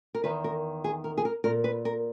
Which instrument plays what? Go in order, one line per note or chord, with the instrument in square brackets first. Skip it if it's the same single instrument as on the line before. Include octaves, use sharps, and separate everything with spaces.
[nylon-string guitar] A#4
E2 D#3 B4
A#4
G#4
A#4
G#4
A#4
A#2 A#4
B4
A#4